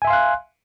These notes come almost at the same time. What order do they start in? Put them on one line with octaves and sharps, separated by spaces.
G#5 E5 C6 F5 F#6